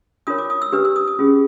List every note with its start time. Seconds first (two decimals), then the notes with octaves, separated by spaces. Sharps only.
0.27 D4 F4 A#4 C#5 D#6
0.38 D6
0.50 D#6
0.62 E6
0.72 D4 G4 B4 D#6
0.85 E6
0.96 D#6
1.07 D#6
1.19 C#4 F4 G#4